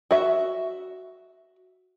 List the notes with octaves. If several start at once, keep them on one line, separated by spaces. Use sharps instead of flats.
F#4 E5